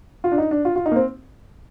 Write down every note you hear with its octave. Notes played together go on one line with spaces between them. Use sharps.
F4
D4
D#4
D4
F4
F4
D#4
A#3
C4